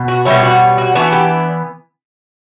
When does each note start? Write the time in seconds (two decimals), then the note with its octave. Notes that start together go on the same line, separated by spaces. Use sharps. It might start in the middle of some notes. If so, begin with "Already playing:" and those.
Already playing: B2
0.08 F#4
0.25 B2 G3 C#4 E4
0.43 F#4
0.78 F#4
0.95 E3 B3 D4 F#4
1.12 G4